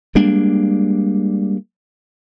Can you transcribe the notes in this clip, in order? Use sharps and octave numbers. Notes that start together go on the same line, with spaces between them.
G3 G#3 A#3 D4